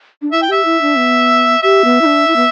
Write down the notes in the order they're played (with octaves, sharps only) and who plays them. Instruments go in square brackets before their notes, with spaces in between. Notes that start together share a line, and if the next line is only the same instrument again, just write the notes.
[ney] D4
[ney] E4 [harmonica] E5
[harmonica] G5
[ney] G4 [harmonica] E5
[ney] E4
D4
B3
[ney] G4 [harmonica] E5
[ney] B3
E4
D4
E4
B3